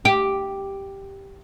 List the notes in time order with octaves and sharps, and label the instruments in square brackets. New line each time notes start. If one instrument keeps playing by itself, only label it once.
[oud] G4